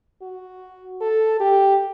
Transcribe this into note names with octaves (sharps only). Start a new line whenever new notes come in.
F#4
A4
G4